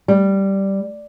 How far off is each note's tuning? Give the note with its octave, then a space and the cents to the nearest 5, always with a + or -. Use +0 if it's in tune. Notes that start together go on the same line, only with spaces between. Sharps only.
G3 -5